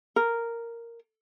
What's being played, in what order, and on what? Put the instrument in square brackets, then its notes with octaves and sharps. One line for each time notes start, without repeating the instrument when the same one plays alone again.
[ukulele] A#4